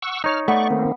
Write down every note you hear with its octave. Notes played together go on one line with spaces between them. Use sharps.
F#5 C#6 E6
D#4 C#5 F6
A3 B3 D5 C#6
D#3 A#3 C4